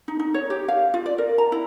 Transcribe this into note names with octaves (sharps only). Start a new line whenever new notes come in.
D#4
D#4
C#5
G4
F5
F4
D5
A#4
A#5
E4